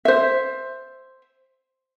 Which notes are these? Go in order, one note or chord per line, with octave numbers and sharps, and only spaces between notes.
C5 E5